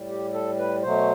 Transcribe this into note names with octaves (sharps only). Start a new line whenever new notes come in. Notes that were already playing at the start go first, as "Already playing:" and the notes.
Already playing: A2 G3
G4
A4
B4
B2 F#3 A3 C5